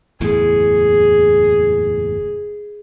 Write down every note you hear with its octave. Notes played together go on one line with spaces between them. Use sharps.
F#1 E2 A2 G#4